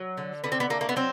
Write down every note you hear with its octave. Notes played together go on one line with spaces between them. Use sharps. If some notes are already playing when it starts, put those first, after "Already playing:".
Already playing: F#3
D3
D3 B3
C4
B3
A3 A#3
A#3
B3
F#3 C4